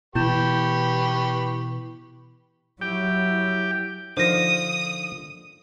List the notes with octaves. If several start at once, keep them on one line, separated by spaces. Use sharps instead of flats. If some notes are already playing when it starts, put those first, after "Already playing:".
B2 E3 E4 G4 B4 C#6 G6 E7
F#3 E4 G4 G5
D3 D#3 F3 C5 D#6 A#6